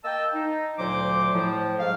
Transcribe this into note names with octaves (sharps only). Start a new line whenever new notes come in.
A#3 D#5 G5 A5 E6
D#4
D2 A#2 F#3 C5 D6
A2 F3
G#2 F#3 F5